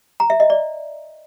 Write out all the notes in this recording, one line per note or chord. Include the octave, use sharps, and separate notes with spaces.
A#5
E5
D#5
D5